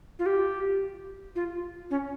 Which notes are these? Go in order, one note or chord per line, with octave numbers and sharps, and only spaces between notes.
F4
G4
F4
C#4